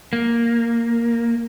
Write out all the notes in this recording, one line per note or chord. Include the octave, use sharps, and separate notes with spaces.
A#3